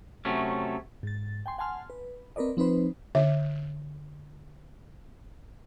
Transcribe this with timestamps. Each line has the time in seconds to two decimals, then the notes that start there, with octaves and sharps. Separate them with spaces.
0.25 C3 F#3 A3 C#4
1.03 G#2 A6
1.46 G5 G#5 C6
1.58 F#5 G#5 A5 C6 F6
1.90 B4
2.36 C4 A#4 B4 D5 D#5
2.57 F3 C4 D#4 B4 C5
3.15 D3 E5